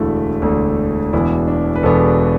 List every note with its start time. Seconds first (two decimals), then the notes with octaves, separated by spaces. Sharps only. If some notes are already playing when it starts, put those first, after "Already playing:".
Already playing: E1 D2 D3 A3 E4
0.42 E1 D2 D3 A3
1.13 E1 E2 B2 B3 D4 E4
1.48 D4
1.76 B4
1.83 E1 E2 B2 B3 D4 A4